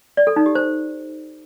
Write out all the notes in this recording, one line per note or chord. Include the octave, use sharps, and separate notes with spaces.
D5
A4
D#4
G4
C5